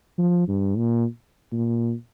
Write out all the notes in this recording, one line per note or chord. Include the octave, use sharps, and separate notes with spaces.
F3
G2
A#2
A#2